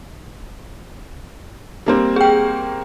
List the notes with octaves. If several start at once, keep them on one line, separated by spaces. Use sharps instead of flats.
G3 A#3 C4
G#4 G5